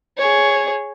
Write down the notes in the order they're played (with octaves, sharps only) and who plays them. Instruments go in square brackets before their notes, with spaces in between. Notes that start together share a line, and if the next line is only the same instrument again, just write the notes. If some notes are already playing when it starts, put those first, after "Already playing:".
[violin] G#4 C#5